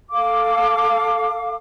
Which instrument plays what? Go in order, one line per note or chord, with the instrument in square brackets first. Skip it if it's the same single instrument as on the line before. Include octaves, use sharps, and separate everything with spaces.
[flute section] A4 F5 D6